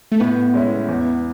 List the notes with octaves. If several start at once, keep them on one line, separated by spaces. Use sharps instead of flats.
A3
A2 B3
G#3 C#4 E4
E2